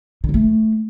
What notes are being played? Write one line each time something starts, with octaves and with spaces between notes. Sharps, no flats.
D3
F#3
A3